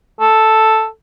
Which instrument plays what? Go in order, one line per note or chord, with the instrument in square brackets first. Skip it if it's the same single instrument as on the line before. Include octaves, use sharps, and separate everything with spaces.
[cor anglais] A4